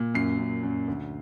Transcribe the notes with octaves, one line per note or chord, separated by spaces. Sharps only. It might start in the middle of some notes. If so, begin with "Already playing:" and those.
Already playing: A#2
F#2 C7
F#2
F#2
D2